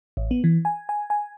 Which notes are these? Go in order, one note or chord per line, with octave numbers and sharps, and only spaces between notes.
A1
B3
E3
G#5
G#5
G#5